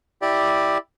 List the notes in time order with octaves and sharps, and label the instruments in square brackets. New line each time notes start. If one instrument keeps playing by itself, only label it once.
[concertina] E4 G4 D5